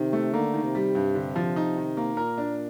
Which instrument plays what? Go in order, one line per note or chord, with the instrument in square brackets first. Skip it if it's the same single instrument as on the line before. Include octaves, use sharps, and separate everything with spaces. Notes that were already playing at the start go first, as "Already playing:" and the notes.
Already playing: [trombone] C3 [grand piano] D#3
[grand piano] A3
[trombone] D3 [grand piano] A#3
[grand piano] D#3
[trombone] C3
[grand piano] G3
G2
D3
F3
D#4
D#3
A#3
[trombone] A#2 [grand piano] A#4
[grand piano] D4